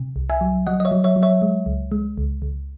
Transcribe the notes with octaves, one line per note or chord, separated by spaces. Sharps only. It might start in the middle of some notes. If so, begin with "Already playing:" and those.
Already playing: C3
C2
E5 G#5
F#3
F#3 D#5 F#5
D#5
C#5 E5
F#3
C#5 E5
F#3
C#5 E5
G#3
C#2
G#3
C#2
C#2